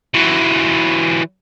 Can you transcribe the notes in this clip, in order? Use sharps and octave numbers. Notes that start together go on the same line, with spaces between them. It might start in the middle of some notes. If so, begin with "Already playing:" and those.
E3 F#3